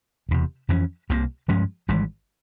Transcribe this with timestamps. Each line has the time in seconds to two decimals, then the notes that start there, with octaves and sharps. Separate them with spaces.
0.29 E1 E2 C3
0.69 F2 E3 A#3 C#4
1.09 C2 C3 F3 A#3
1.48 G2 F3 G#3 C#4
1.88 G#1 G#2 E3 G3